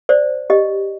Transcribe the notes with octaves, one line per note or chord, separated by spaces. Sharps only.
C5 D5
G4 D#5